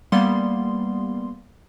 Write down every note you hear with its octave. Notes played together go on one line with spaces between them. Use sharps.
G3 A#3 B3 C6